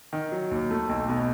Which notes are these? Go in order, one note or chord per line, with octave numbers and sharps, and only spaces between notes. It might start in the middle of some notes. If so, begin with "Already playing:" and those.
D#3
F#3
D#2
A3
B1
B2